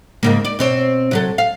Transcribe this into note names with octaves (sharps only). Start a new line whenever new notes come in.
G#2 C#3 A#3
D5
B2 C4 C#5
C3 F#3 A4
F5